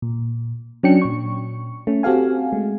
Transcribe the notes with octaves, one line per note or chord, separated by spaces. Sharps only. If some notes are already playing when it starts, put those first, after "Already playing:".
A#2
F#3 C#4 D4 G5 C#7
A#2 C#6
A3 C#4
C4 F#4 G4 A4 F5 G#5
G#3 A3